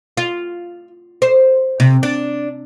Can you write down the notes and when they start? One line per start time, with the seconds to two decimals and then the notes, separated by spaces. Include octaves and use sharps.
0.17 F4
1.22 C5
1.80 C3
2.03 D4